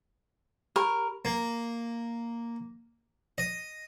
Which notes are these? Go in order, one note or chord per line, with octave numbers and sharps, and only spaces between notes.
G4 A#4 C#5 B5
A#3
D#5